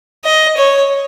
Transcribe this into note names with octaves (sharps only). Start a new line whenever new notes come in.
D#5
C#5